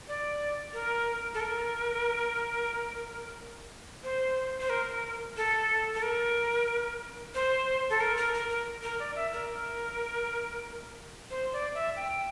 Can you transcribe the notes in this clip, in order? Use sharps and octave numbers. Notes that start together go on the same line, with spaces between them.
D5
A#4
A4
A#4
C5
C5
A#4
A4
A4
A#4
C5
A4
A#4
A#4
A#4
A#4
A#4
D5
E5
A#4
C5
D5
E5
G5